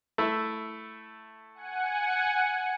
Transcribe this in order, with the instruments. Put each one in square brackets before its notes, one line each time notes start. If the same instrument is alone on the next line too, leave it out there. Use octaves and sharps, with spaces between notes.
[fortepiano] A3 E4
[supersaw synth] F#5 G#5 C#7